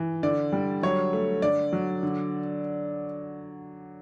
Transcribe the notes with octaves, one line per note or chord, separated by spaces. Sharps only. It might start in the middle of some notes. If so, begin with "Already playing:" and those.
Already playing: E3
D3 D5
G3
F#3 C#5
A3
D3 D5
F#3
D3